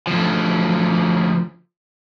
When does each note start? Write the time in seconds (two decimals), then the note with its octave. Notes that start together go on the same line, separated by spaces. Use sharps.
0.07 D2 F3